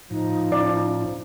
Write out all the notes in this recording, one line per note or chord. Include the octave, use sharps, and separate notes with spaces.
A2 F3 D#4
A2 C#4 E4 D5